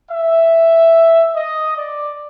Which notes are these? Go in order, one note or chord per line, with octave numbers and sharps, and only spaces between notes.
E5
D#5
D5